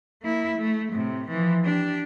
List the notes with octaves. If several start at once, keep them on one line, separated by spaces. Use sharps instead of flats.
A#3 E4
A3
A2 C3
E3 F3
D4 G4